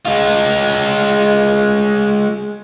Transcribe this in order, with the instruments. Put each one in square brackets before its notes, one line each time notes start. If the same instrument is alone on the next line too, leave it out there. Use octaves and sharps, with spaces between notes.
[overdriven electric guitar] G#3 F4